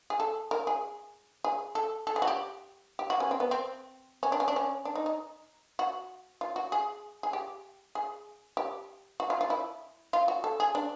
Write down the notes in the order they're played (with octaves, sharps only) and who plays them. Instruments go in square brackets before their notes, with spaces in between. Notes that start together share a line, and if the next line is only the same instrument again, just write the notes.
[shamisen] G#4
A4
A#4
G#4
G#4
A4
A4
G#4
F#4
G4
G4
F#4
C#4
C4
B3
C4
C#4
D4
C#4
D4
C#4
D4
D#4
D#4
F#4
F4
F#4
G#4
G#4
G4
G#4
G4
F#4
F4
F4
E4
F4
F#4
A4
G#4
D4